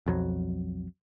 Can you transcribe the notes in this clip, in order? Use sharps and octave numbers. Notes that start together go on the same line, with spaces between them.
B1 F2 F#3